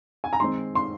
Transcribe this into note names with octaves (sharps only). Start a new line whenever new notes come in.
G#5
A#5
D#3 G#3 C4 C6
C6